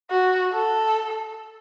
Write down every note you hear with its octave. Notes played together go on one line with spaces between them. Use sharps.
F#4
A4